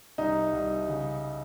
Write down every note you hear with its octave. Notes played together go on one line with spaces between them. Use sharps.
C2 D#4
C2
C#3